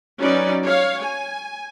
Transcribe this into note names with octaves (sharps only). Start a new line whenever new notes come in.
F#3 C#4 D#4 B4 D5
C#5 F5
G#5